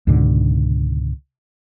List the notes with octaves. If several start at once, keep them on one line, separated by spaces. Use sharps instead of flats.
C#2 G#2 B2 D3